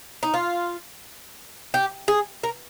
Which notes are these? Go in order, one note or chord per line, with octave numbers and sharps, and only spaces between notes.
D#4
F4
G4
G#4
A#4